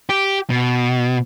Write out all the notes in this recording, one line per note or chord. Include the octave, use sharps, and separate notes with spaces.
G4
B2